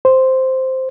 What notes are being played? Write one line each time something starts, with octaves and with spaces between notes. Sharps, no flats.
C5